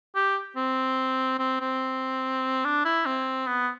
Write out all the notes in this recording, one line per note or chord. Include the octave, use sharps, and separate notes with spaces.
G4
C4
C4
C4
D4
E4
C4
B3